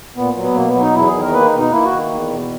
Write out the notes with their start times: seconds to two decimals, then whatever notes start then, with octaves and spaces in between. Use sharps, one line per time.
0.16 A#2 B3
0.36 F#3
0.43 B3
0.55 B2 A#3
0.68 B3
0.74 F#3
0.81 D#4
0.95 E2 E4
1.07 G#4
1.14 D#3
1.21 A#4
1.33 A#3 B4
1.45 D#4
1.53 B2
1.59 D#4
1.71 A#3 E4
1.85 F#4
1.91 D#3
2.11 E2
2.30 B2